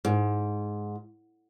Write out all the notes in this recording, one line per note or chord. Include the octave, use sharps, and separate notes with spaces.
G#2